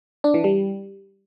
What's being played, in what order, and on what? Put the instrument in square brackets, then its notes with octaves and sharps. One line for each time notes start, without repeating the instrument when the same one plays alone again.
[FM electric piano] D4
E3
G3